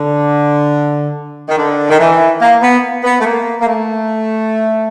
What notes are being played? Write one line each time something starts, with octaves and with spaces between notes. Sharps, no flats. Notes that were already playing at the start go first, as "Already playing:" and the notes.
Already playing: D3
D#3
D3
D#3
E3
A#3
B3
B3
A3
A#3
A#3
A3